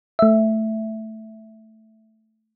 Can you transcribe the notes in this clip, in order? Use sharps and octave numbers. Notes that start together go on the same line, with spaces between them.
A3 E5